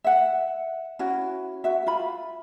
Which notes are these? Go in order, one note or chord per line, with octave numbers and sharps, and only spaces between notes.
E5 F#5
C#4 E4 F#4
F#4 E5
F4 B5